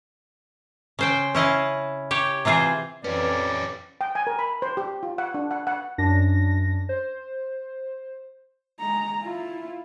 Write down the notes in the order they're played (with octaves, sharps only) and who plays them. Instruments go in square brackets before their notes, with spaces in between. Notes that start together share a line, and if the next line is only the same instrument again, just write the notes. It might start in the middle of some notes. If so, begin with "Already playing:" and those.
[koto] C#3 C5 G5
C#4 E4 D#5 F5
G4 C#5
C3 E3 F4 G#4 C5
[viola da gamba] F2 E3 [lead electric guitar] C#4 G4 [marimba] B4 [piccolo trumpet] D5
[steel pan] G5
G#5
A#4
B5
C5
G4
F4
F#5
D4
F#5
F#5
[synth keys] F#2 D4 A#6
C5
[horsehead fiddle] G#3 A#5
E4 F4